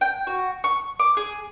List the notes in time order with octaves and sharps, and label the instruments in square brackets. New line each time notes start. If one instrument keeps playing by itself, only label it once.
[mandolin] G5
F#4
C#6
D6
G#4